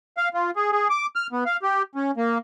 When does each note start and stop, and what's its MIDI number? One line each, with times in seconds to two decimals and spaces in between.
0.17 0.29 77
0.34 0.51 65
0.56 0.71 68
0.72 0.88 68
0.90 1.06 86
1.16 1.27 89
1.32 1.44 59
1.46 1.57 77
1.62 1.82 67
1.95 2.11 61
2.17 2.38 58